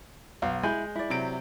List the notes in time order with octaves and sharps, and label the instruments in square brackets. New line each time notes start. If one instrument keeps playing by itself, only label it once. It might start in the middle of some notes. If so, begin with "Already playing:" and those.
[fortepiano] B1 [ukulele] F5
[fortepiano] G#3 [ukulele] E4 G#5 B5 [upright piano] G6
[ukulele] E4 D5
[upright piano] C3 F#3 D7